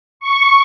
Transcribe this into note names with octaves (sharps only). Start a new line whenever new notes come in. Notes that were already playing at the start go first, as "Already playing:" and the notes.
C#6